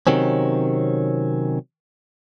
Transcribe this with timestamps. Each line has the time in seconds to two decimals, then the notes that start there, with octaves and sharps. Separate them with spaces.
0.07 C3 D#3 F#3 C4 C#4